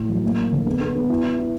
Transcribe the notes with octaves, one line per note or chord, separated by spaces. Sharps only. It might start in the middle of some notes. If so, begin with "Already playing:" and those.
Already playing: A2
F#3
A#3
A#3
D3
B3
B3
B3
E4
E4
E4